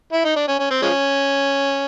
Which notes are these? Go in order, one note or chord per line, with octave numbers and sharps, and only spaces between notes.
E4
D#4
D4
C#4
C#4
C4
F3 G#3 C#4